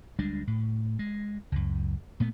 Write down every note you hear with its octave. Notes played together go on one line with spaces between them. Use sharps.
D2 G3 G#3 D4
A2
G#3
C#2 F#2
A#2 A3 B3